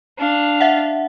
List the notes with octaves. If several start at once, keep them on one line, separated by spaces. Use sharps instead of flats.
D4 F5
E5 F#5